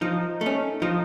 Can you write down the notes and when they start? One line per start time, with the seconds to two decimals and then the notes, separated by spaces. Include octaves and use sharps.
0.01 F3 D#4
0.41 A3
0.46 C#4
0.82 F3 D#4